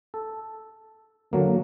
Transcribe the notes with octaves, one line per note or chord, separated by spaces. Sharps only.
A4
D3 F#3 A#3